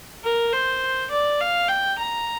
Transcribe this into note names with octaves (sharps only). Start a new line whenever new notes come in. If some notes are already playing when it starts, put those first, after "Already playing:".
A#4
C5
D5
F5
G5
A#5